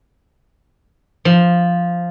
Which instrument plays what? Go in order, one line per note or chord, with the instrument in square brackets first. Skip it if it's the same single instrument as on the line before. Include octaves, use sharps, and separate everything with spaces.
[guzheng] F3